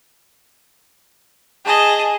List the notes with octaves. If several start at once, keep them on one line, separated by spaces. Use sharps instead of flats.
G#4 D#5 A5